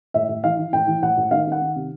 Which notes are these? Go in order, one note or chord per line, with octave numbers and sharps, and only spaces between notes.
A2 E5
A2
E3 F5
E3
A2 G5
E3
A2 F#5
A2
D#3 F5
D#3 F#5
D#3
C3